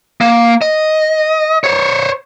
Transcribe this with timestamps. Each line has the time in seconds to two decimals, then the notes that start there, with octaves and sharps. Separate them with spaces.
0.21 A#3
0.62 D#5
1.64 C5 C#5